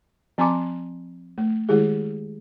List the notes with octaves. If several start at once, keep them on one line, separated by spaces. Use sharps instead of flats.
F3 C4 G#5 A#5 C6 D6
A3
D#3 G#3 E4 G4 G#4